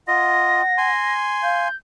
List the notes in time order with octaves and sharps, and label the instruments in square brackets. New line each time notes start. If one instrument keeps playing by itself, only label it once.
[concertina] F4 D#5 [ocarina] F#5 [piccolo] A#6
[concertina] G#5 C6
[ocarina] F5 [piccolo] G6